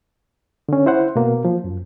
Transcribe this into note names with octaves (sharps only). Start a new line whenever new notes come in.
D3 C#4
E4 C5 F#5
B2 A#3
F3
F#2